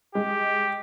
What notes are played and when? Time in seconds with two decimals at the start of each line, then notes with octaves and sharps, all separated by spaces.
0.15 G#3 G4